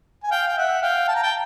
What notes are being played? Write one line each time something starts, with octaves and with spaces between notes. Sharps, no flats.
G#5
F5 G5
G5
E5 F#5
F5 G5
A5
A#5
G5 A5